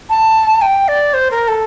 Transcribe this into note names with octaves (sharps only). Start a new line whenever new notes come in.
A5
G5
D5
C5
A#4
A4